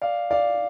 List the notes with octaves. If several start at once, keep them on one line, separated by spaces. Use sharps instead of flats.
D5 F5
D5 F5